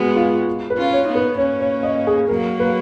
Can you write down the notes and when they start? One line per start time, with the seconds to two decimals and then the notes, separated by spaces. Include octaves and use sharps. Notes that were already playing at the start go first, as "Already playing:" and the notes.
Already playing: G#3 B3 F#4
0.16 F4
0.70 B4
0.77 C#4 F4
0.93 C#5
1.08 B3 D#4
1.15 B4
1.37 A#3 C#4 C#5
1.61 C#5
1.83 D#5
2.07 G#4
2.29 F#3 A#3 A#4
2.60 B4